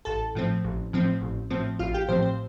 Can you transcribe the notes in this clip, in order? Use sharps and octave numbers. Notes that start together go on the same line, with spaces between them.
A1 A4 A5
A2 F3 C4
A1
A2 F3 C4
A1
A2 F3 C4
A1 F4 F5
G4 G5
A2 F3 C4 C5
C5